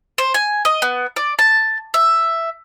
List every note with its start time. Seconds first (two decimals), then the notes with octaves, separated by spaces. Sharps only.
0.18 C5
0.34 G#5
0.65 D#5
0.82 B3
1.16 D5
1.39 A5
1.94 E5